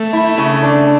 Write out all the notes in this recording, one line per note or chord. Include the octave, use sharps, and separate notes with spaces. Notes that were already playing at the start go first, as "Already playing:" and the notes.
Already playing: A3
E4
C#3
D4